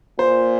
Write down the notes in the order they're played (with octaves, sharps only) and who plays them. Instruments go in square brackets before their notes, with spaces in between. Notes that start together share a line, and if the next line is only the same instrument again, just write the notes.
[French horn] A#2 [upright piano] C5